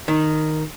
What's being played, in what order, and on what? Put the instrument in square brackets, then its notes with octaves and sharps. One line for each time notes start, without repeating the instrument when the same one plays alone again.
[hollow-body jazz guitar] D#3